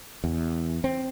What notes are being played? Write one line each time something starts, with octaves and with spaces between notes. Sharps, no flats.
E2
C4